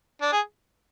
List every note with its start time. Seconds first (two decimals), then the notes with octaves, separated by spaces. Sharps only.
0.21 D4
0.32 G#4